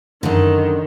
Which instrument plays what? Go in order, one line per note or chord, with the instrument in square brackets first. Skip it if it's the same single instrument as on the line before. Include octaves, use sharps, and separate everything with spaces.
[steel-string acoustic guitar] F#2 D3 [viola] D#3